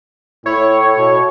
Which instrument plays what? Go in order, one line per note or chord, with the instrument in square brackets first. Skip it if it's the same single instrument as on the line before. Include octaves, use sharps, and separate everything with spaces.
[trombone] A2 [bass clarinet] E4 [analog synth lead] C#5
[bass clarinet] B2